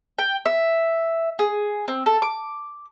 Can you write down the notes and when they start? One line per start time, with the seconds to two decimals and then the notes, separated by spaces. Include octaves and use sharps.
0.19 G5
0.46 E5
1.39 G#4
1.88 C4
2.06 A4
2.22 D6